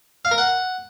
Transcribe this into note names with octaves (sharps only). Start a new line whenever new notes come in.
F5
A#4
F#5